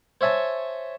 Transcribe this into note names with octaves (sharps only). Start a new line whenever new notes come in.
C5 C#5 E5 G#5 A5